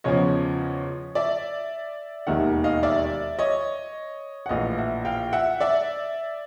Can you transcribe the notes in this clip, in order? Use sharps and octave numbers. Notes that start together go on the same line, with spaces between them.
E2 C#3 F3 C#5 D#5
D5 E5
E1 D#2 D#3 E5 F#5
D#5 F5
D5 E5
C#5 D#5
F#5
A#1 A2 E3 D#5 F5
E5 F#5
F5 G5
E5 F#5
D5 E5